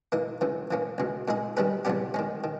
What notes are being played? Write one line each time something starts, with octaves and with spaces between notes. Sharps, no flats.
E3 A#3 D#4
C#2 C#3 E3
E3 A#3 C#4
C#2 B2 G#3
A#2 G#3 D#4 G#4
D#3 G3 C#4 G#4 B4
E2 C#3 G3 B3 G4
D#3 G#3 C#4
D#3